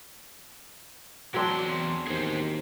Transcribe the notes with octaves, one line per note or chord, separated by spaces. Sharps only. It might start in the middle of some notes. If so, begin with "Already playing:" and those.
E2 F#3 C4 D4 C6
D#2 G#4 C5